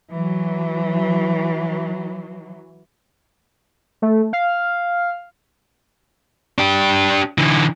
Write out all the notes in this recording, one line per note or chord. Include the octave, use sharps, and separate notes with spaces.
E3 F#3
A3
F5
D4 G4
D3 E3